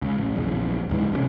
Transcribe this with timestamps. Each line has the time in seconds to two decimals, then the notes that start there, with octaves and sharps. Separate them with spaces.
0.02 C#2
0.18 A1
0.35 A#1 E2 C#3
0.90 D1 C#2 G#2 E3
1.12 B1 C3 G3 C#4